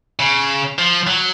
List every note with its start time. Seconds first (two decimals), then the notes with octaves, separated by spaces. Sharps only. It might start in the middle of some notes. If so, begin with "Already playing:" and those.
0.20 C#3
0.79 F3
1.07 F#3